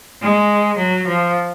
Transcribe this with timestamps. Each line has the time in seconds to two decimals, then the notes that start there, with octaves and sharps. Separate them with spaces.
0.21 G#3
0.78 F#3
1.07 F3